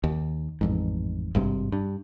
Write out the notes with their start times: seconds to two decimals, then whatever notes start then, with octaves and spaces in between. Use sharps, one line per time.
0.04 D#2
0.61 A1 F2 G#2
1.35 G#1 G2 C3
1.72 G2